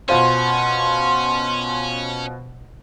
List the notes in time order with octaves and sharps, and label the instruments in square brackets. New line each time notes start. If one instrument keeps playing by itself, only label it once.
[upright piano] B2 F4 C5 [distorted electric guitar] C#4 [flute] C6